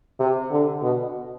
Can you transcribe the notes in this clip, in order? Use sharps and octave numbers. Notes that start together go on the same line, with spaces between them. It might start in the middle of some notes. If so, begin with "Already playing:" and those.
C3
D3
B2